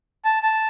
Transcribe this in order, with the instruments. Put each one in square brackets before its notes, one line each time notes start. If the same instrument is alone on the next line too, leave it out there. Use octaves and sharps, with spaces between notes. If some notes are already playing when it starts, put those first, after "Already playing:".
[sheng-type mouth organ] A5
A5